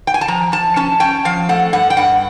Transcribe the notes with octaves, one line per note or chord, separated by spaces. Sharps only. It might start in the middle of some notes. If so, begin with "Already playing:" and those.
G5
G#5
A5
F3 A#5
F3 A5
C#4 A5
C#4 G5
F3 F5
A3 F#5
G2 F#5
G5
G2 F#5